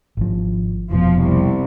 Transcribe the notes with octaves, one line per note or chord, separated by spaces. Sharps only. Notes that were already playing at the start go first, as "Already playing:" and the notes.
G#1 F3
F1 B2 F3
C2